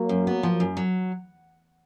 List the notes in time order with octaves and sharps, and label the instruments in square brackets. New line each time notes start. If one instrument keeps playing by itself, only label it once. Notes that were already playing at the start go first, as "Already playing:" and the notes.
Already playing: [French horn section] F#3 A#3
[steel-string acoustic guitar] F#2
B3
F3
F#2
F#3